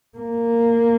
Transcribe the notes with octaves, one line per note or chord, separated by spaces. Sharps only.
A#3